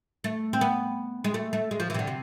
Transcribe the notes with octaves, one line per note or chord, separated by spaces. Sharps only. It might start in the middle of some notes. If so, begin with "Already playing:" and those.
A3
C4
B3
G#3
A3
A3
G#3
F3
E3
C3
D3
C3